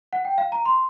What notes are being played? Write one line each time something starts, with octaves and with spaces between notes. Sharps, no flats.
F#5
G5
F5
A#5
C6